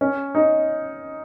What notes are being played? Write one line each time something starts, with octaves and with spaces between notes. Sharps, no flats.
C#4
D#4